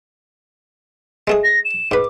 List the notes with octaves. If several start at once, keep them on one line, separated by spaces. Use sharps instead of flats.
G#3 A3 G#4
A#6
E7
G#2 B4 D6